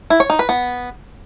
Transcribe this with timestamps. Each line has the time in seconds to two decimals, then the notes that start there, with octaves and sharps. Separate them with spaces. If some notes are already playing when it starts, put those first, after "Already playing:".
0.10 E4
0.20 C#5
0.30 D#4
0.39 B4
0.49 B3